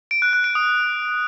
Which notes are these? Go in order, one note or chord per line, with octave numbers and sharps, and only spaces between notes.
D7
F#6
F#6
D7
D#6